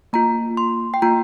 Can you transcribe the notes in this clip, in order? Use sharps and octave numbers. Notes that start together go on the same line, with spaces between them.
A#3 F4 A#5
C6
G5
A#3 F4 A#5